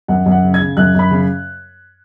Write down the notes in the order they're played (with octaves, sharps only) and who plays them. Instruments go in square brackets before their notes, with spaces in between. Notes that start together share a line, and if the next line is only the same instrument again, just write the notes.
[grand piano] F#2 F#5
F#2
F#5
C#3
G#6
C#3
F#2 F#6
F#2 B5
C#3